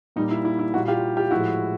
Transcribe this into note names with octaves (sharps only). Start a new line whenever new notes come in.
A#2 G3 A#3 D#4
E4
E4
E4
A#2 G3 A#3 E4 F#4
F4 G4
F4 G4
A2 F3 G#3 E4 F#4